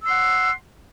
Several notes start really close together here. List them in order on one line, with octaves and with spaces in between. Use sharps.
E6 C6 F#5